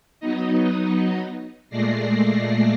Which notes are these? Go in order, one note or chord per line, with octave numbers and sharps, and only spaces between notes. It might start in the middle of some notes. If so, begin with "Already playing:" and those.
F#3 B3 D#4 D#5
A#2 G#3 A3 D5 A#6 C7